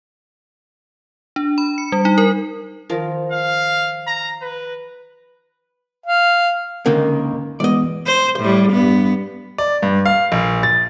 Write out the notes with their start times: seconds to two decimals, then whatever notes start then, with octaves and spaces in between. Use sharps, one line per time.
1.36 D4
1.58 B5
1.78 C#7
1.92 G3
2.05 D#4
2.18 A#4
2.90 D#3 F3 A#4
3.32 F5
4.07 A#5
4.42 B4
6.06 F5
6.86 C#2 D3 D#3 A#3 C#4
7.60 E3 G#3 B3 D5 D#5
8.06 C5
8.40 A2 G3
8.72 G2 B3
9.58 D5
9.82 G2
10.06 F5
10.32 A#1
10.63 A6